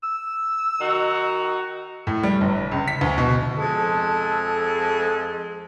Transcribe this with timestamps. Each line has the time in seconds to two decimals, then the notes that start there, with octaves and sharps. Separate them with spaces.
0.03 E6
0.80 D#3 D#4 F#4
2.07 A2
2.23 G3
2.41 G1
2.71 C#2
2.88 B6
3.01 D2
3.18 B2
3.57 F2 G#3 A4